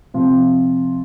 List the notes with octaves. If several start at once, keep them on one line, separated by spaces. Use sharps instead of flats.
C3 F3 C4 F4